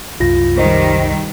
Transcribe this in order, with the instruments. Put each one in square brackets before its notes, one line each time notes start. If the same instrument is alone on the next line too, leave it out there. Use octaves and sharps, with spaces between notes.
[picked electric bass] C2 F#2 [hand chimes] F4 A#6
[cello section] D#3 G3 [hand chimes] C5 D#5